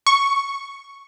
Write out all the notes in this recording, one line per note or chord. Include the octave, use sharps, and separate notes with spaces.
C#6